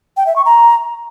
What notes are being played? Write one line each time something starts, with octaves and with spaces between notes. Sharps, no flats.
G5
E5
C#6
A#5